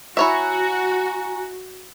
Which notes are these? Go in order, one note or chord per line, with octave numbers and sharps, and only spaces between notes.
E4 F#4 C#5 E5 G#5 A#5